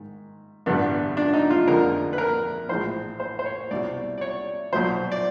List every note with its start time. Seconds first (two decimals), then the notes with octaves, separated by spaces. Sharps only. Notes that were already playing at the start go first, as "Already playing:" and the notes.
Already playing: G#2 D#3
0.66 A1 G2 D3 G3 B3
1.17 D4
1.34 D#4
1.50 F4
1.67 F2 D3 F3 G#3 A#4
2.13 B4
2.18 A#4
2.69 A#1 A2 E3 G#3 C5
3.20 C5
3.39 C5
3.46 C#5
3.71 C2 B2 G3 D5
4.18 D5
4.21 C#5
4.73 B1 A#2 F#3 C5
5.12 D5